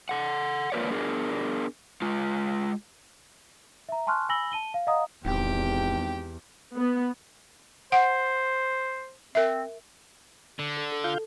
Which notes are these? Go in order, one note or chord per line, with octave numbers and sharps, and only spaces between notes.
A4 F#5
A#3 F4 A#4 B4 C#5 D5
B3 D4 G#4 A#4
G#3 F4
E5 A#5
G#5 A5 C6 C#6 F6 F#6
G#5 B5 E6 A#6 F#7 G7
A5 D#7 G7
F5
D#5 F5 F#5 A#5 D#6
D1 G#1 E2 G4 G5
B3
C5 F#5
C4 A#4 E5
D3
A4
A4
F4 F5 G6